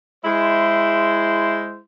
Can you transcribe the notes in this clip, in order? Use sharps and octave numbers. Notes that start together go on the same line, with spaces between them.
G#3 E4 C5